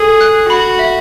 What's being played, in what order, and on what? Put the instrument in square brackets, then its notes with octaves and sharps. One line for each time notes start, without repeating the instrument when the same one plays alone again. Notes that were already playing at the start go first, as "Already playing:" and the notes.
Already playing: [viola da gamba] G#4 [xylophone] A4
[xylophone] F#6
[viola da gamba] F#4 [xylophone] B5
[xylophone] E5